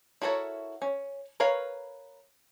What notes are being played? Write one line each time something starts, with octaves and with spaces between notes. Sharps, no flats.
E4 F#4 A4 A#4 C#5
C#4
A#4 B4 C#5 F5